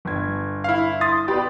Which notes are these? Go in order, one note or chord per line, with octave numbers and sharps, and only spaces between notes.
G1 G#6
E4 F5
C6 D#6 A6
G4 B4 D5